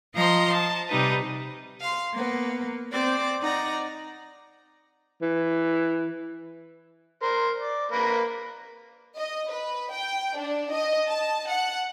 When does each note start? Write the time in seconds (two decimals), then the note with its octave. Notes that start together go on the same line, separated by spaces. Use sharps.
0.15 F3 D#5 A#5 C6
0.52 A5
0.89 C3 G3 D#4 B4
1.80 F5 C6
2.13 A#3 B3
2.92 C4 D5 D6
3.40 D#4 D5 F#5 A#5
5.22 E3
7.22 A#4 C5
7.58 D5
7.92 A#3 A#4 B4
9.18 D#5
9.51 B4
9.92 G5
10.37 D4
10.71 D#5
11.07 A5
11.47 F#5